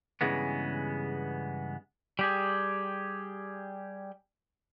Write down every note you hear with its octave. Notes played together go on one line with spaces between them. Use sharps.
G2 C#3 E3 G#3 B3
G3 G4 G#4